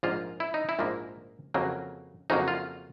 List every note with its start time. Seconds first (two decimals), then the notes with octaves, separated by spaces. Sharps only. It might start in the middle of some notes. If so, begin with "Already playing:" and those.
0.03 A#1 G#2 F3 A#3 F4
0.40 E4
0.54 D#4
0.69 E4
0.79 A#1 G#2 F3 A#3
1.54 F2 C#3 F#3 A#3
2.30 F2 C#3 F#3 A#3 D#4
2.48 F4